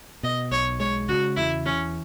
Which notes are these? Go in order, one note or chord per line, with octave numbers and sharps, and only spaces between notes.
B2 D#5
B1 C#5
G#3 C#5
C#3 F#4
E2 E4
E3 C#4